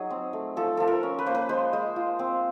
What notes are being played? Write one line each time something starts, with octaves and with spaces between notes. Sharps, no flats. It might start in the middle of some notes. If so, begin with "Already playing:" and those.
Already playing: F#3 D#4 G#4
C4
A3
F3 A4
F3 A4
A#4
C#4
B4
A#3 C5
B4
G#3 C5
G#3
F4
C4